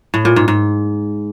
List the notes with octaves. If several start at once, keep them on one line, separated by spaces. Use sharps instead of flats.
A2
A#2
G#2
G#2